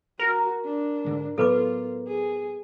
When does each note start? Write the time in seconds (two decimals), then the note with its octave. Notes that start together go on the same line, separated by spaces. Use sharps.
0.19 F#4 A#4
0.64 D4
1.05 G#2 D3 G#3
1.38 A2 F#3 B3 F4 A4 B4 D6
2.08 G#4